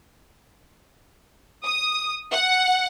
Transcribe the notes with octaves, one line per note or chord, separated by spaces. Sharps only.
D#6
F#5